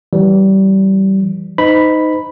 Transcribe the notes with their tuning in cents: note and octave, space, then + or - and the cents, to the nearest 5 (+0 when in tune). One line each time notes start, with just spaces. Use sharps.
E3 +0 G3 -25
D#4 +0 C5 -40 B5 +0